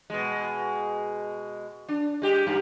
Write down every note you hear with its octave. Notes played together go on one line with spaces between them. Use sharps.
B2 G#3
D4
G#3 G4
G2